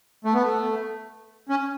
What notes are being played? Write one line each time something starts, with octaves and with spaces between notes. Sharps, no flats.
A3
B3
A3
C#4